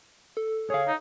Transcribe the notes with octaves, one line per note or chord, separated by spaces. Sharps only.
A4
G#4 C#5 F5
D#4